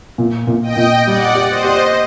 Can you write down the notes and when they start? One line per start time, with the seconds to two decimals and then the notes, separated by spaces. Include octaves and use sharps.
0.18 A#2
0.47 A#2
0.62 D#5 G5
0.76 A#2
1.06 G3 D5 F#5
1.35 G4
1.50 C5 D#5
1.64 G4